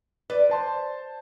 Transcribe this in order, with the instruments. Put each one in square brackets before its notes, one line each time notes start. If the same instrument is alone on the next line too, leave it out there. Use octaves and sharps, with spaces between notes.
[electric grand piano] B4 [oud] D5
[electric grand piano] C5 A5 C6